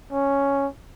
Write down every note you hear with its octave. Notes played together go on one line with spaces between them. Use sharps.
C#4